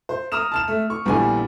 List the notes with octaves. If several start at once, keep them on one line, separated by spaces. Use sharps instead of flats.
C5
A#5 D#6 F6 E7
A5 F6 E7
A3
C#6
A#1 E2 D3 G3 G#5